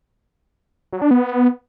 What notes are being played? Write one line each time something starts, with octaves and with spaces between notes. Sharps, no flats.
F#3
D4
B3